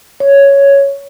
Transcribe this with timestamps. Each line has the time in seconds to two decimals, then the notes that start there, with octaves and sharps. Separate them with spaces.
0.20 C#5